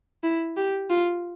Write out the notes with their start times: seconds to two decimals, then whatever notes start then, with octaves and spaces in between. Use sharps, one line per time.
0.24 E4
0.57 G4
0.90 F4